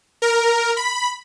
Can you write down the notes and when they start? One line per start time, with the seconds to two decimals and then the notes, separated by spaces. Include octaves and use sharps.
0.22 A#4
0.77 B5